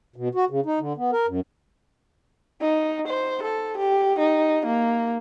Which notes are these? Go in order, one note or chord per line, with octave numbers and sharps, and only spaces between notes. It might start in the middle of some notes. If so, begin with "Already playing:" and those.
B2
F#4
C#3
D#4
D3
B3
A#4
F#2
D#4
C5
A4
G4
D#4
A#3